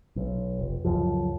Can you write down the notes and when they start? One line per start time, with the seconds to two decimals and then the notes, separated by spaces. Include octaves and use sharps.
0.16 B1
0.59 F1
0.84 C#2 F#2 F3